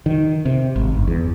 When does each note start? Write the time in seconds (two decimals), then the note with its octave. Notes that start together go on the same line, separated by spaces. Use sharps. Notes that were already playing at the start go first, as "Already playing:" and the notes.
0.06 D#3
0.45 C3
0.76 G#1
0.95 G1
1.07 E2